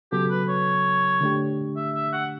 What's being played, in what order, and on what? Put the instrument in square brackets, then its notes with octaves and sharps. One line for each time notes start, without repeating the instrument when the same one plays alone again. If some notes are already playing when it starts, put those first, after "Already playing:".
[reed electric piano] C#3 F#3 B3 F#4 A4 [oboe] G4
[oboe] B4
C#5
[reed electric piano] D3 A3 D4 G4
[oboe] E5
E5
F#5